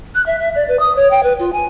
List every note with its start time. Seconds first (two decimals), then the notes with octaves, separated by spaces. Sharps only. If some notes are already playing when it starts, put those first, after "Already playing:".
0.15 F#6
0.26 E5
0.39 E5
0.55 D5
0.68 B4
0.79 D#6
0.95 C#5
1.11 G5
1.23 B4
1.39 F4
1.53 G#5